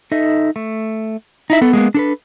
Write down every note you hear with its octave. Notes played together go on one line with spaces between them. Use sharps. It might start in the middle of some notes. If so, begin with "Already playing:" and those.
D#4 A4 D#5 E5
A3
D#4 E4 E5
B3 A4
G#3 A#3 B3
D4 A4 B4